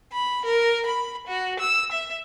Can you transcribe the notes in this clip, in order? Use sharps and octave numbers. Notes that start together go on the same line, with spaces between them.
B5
A#4
B5
F#4
E6
E5